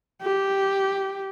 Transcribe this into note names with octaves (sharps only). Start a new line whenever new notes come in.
G4